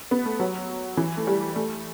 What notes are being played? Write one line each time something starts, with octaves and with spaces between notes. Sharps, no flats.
B3
A3
F#3
E3
A3
G3
A3